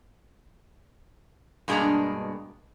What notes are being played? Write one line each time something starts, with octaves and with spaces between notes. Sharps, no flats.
G2 B2 G#3 A#3 D4 A#5